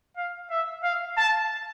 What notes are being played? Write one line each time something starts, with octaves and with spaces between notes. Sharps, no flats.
F5
E5
F5
A5